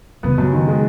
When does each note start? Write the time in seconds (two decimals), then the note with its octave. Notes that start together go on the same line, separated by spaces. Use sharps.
0.23 C#3 B3
0.38 F#2
0.53 D#3
0.68 G#3